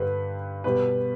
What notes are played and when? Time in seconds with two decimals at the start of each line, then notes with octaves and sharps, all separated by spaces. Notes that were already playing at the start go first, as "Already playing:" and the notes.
Already playing: G2 D3 G3 B4
0.64 B2 G3 B4